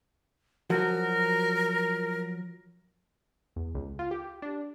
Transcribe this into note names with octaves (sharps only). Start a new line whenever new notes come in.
F3 F#3 F#4 A#4
E2
C#2
F4
G4
D4